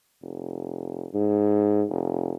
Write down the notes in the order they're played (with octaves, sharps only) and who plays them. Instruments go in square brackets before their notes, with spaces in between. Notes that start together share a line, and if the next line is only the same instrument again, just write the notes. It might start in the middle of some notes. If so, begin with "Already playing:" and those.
[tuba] F1
G#2
F1